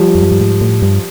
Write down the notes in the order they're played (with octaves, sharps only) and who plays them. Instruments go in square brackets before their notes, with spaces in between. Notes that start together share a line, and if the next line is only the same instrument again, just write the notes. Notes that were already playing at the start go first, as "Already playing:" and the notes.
Already playing: [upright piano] F3 G3
[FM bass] F2
F#2
G2
G#2
A2
G2